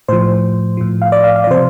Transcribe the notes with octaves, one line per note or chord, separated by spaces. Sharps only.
A2 F3 C5
A2 F3
F5
D5
F5
F5
D5
C3 F3 C5